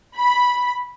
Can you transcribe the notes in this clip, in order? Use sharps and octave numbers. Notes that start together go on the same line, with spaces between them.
B5